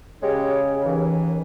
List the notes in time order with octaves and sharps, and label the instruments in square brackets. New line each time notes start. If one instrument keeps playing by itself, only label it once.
[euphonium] C#3 [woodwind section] G#3 G4 C#5
[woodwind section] D#2 E3